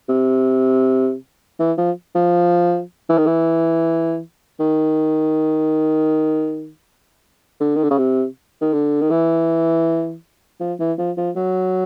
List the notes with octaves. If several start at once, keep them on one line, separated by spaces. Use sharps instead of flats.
C3
E3
F3
F3
E3
D#3
E3
D#3
D3
D#3
D3
C#3
C3
D#3
D3
D#3
E3
F3
E3
F3
F3
F#3